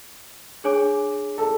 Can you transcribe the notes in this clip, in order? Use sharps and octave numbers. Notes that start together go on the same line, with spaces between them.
D4 G#4 C#5 G#5 D6
A4